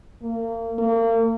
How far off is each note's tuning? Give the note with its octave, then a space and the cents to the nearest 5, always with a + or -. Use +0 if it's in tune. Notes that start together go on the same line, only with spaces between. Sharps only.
A#3 -35
A#3 -35